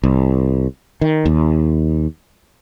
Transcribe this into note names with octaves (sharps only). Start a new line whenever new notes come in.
C2
D#3
D#2